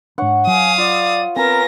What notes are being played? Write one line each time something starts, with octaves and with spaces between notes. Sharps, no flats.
G#2 D4 C#5 F#5
F#3 F5 G#5 D#6
F4 D5
B3 C4 A#4 G#5 A#5 B5 A#6